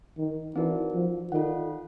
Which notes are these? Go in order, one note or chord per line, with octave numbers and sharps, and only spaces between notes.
D#3
E3 C4 D#4 F#4 A#4 D5
F3
D#3 F4 A4 D5 F#5